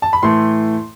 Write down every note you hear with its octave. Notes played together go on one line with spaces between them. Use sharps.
A5
B5
A2 E3 A3 C6